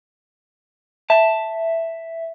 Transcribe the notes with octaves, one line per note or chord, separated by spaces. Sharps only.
E5 A5